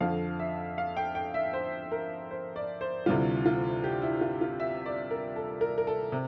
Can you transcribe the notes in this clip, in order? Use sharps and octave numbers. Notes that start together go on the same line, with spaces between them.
F2 D3 F3 F5
E5
F5
G5
G5
E5
C5
A#4
C5
D5
C5
D2 C3 E3 G3 F4
F4
G4
E4
F4
F4
E5
D5
A#4
A4
A#4
A#4
A4
C3